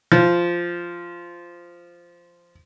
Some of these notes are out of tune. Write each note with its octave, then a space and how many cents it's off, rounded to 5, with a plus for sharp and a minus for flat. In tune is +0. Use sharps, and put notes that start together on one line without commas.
F3 -10